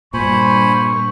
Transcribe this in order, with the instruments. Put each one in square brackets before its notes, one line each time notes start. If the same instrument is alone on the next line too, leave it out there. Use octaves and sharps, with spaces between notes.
[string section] G2 A#3 [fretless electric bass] A#2 [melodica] C5 G#5 B5 [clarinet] C#6